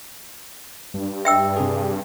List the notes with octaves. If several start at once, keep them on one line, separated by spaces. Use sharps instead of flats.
G2
E5 G5 E6
C3 G#4